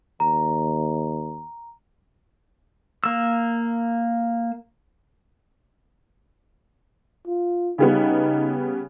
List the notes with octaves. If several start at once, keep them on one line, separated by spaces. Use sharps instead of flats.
D#2 A#5
A#3 E6
F4
C#3 G3 B3 D#4